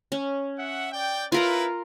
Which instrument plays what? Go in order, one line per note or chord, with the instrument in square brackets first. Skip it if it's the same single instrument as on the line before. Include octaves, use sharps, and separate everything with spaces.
[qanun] C#4
[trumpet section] E5 F#5
D5 G5
[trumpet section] E4 B4 [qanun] F4 A#4 A#5